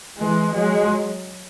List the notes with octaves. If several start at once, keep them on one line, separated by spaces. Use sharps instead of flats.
E3 G#3
F#3 G#3